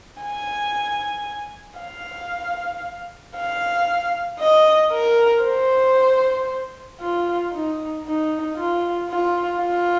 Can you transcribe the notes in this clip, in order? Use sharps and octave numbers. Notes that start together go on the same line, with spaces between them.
G#5
F5
F5
D#5
A#4
C5
F4
D#4
D#4
F4
F4
F4